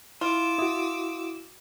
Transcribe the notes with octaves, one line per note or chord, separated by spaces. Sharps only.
E4 F4 D6 E6
E4 F#4 D#6